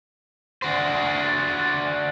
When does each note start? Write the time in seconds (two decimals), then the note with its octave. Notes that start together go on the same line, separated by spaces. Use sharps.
0.62 D4 F#4 C5